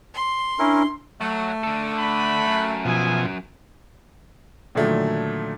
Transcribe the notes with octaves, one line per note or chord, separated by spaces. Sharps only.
C6
C#4 D4 E4 A#4
F#3 A3 F#4
D3 A4
F#5 B5
F#2
B2 F3 G#4 E5 G#5
A#2 D3 D#3 F3 F#3 A3